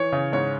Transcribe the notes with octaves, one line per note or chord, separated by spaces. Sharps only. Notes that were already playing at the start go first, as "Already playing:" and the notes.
Already playing: E3 C#5
C#3
G#2 C#5